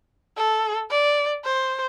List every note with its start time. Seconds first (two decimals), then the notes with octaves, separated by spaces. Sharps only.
0.37 A4
0.91 D5
1.44 C5